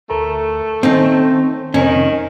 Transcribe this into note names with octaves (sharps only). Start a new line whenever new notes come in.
D2 A3 A#4 A#5
D#3 C4 C#4 D#4 C5
F2 C3 D#3 C4 C#4